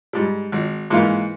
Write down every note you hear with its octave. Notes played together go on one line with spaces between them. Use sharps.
G#2 G3
G#1
G#2 E3 A#3 F4